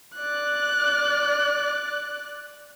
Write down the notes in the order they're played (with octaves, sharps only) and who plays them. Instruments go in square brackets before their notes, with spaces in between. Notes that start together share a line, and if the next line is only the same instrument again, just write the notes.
[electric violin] D5 F#6